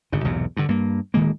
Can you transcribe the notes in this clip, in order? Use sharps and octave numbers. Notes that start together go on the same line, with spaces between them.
G1 C#3
B1 E2 G#2 C3
G2 D3
G2 A#3
D1 D#3 G#3 A#3